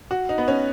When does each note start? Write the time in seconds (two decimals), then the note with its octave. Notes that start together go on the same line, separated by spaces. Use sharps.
0.11 F#4
0.29 D#4
0.38 B3
0.48 C#4